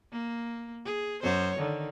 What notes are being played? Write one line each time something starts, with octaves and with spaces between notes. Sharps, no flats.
A#3
G#4
F#2 C5 C#5
D3 D#3